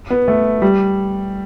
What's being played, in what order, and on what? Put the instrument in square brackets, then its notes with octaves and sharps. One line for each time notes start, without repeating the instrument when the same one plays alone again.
[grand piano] B3
A3
G3